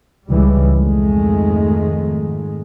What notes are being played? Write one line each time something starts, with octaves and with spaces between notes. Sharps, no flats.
C#2 E3 G3
F2 G#2 D#3 G#3 A3